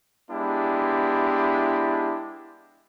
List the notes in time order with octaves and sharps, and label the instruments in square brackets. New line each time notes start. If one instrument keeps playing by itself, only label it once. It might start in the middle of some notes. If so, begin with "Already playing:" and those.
[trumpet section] G#3 B3 D4 E4 G4